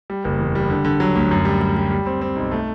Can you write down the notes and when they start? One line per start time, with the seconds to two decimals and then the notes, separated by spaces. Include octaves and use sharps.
0.10 G3
0.24 F#1
0.39 E2
0.55 G3
0.70 D3
0.85 D3
1.00 F#3
1.16 D2
1.31 F#2
1.45 G3
1.61 G3
1.77 G3
1.91 G3
2.06 C4
2.21 C4
2.36 B1
2.51 A3